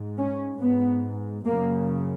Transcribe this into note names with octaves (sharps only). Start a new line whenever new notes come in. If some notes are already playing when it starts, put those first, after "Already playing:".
Already playing: G#2
C#4
G#2 B3
F#2 C#3 A#3